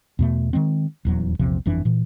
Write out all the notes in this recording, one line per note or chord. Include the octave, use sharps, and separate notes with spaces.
E2 B2 A3
D#3 E3 G#3 C4
D#1 E2 F#3
A#1 E2 C3 F3
G1 F2 E3 D4
A#2 E3